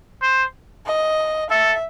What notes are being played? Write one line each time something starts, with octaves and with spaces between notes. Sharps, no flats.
C5
D#5
A4 E5